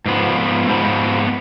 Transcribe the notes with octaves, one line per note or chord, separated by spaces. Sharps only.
G#2 F3 B3
G#2 F3 B3